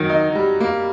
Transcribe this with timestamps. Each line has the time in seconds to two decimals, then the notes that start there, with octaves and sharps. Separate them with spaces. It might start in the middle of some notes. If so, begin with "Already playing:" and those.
Already playing: D#3 F#3
0.09 D#4
0.35 G3
0.60 A#3